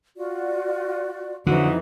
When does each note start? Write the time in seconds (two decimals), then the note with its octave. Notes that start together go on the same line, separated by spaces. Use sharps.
0.17 F4 F#4 D5
1.47 F2 D3 E3 F#3 D#4 F#4